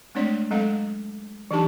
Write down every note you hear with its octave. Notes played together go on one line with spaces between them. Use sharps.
G#3 A3 C4 D4 C#5 D5
F#3 G#3 C4 A4 D#5 F5
E3 F#3 D4 D#4 G4 A5